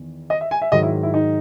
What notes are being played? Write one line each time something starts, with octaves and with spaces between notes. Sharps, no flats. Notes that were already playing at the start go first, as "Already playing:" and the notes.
Already playing: E2 D#3
D#5
E5
G#5
E5
G#2 D#3 F#3 D#5
E4
E4
D#4